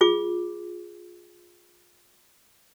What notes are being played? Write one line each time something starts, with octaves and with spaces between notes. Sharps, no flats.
F4 G#4 D6